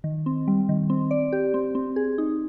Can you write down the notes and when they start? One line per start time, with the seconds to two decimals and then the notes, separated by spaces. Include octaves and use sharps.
0.04 D#3
0.26 C4
0.48 G3
0.69 D#3
0.90 C4
1.11 D5
1.33 G4
1.54 C4
1.75 C4
1.96 G#4
2.18 D#4